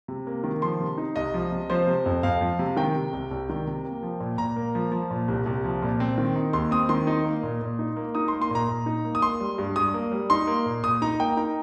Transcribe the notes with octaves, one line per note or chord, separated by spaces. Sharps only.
C3
A#3
D#3
F3 C6
C3
D#4
C2 D#5
F3
C3
F3 C5
C3
F2
F2 F5
F3
C3
D#3 G5
C3
C2
C2
D#3
C3
A#3
F3
A#2
A#2 A#5
A#3
F3
F3
A#2
C2
C2
F3
A#2
C4
D#3
D#4
D#2 C6
C4 D#6
D#3 C6
D#4
A#3
A#2
A#2
D#4
A#3
D#4 D#6
C6
A#3
C6
A#2 A#5
A#2
D#4
A#3
D#6
A#3 C6
G3
G2
G2 D#6
A#3
G3
D#4 C6
A#3
A#2
A#2 D#6
D#4 A#5
A#3 G5
D#4 A#5